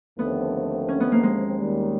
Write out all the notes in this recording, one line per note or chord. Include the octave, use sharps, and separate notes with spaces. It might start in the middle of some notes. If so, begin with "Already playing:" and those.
D#2 D3 F3 A3 B3 C4
C#4
B3
A#3
G#3
D#2 D#3 G3